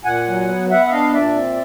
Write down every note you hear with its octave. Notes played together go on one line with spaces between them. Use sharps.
A#2 F#5 G#5
F#3
B3
B3 E5 F#5
E5
D4 D#5 F5
A#2 D5 E5
C4